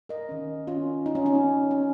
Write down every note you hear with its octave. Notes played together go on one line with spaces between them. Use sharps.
A#4 D#5
D#3 C#4
C#4 F4
D#4
C#4
C#4
D#4
C#4